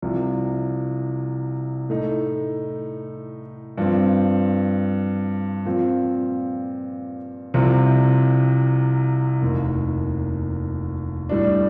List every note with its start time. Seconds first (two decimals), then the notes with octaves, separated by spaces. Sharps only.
0.02 C2 C3 F3
1.90 A2 A3 D#4
3.78 G2 F3 C4
5.65 A#2 F3 C4 F4
7.54 C2 C3 F3 C4
9.42 F1 D#2 D#3
11.29 A2 G3 D4